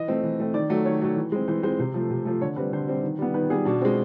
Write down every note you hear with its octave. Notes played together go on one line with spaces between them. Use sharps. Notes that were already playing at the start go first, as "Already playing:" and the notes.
Already playing: E3 D#5
A3 C4
E3
A3 C4
D#3 D5
F#3 A3
D#3 C#5
F#3 A3
E3
G#3 C4
E3 C5
G#3 C4 C5
C3 C5
F3 A3
C3
F3 A3
D3 C#5
G3 C4 B4
D3 C5
G3 C4
D#3
G3 B3
D#3 B4
G3 B3 G#4
B2 D4
G#3 C4